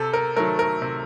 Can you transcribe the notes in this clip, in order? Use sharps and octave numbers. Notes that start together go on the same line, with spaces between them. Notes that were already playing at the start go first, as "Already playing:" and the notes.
Already playing: C3 A4
A#4
D#3 F#3 A3 A#4
A#4
C3